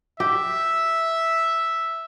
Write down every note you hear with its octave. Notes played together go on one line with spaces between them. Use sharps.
G4 E5